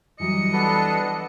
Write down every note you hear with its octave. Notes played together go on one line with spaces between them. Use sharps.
E3 F#3 G3 D#5 C#7
B3 D4 A4 B4